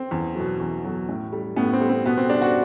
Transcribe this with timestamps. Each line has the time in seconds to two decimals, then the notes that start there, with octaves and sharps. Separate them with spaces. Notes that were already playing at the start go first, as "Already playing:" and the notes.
Already playing: C4
0.11 E2
0.35 B2 F#3
0.60 E2
0.84 B2 F#3
1.09 A2
1.32 G3
1.56 A2 B3
1.73 C4
1.81 G3
1.89 C4
2.06 B2 B3
2.17 C4
2.30 G3 D4
2.42 F#4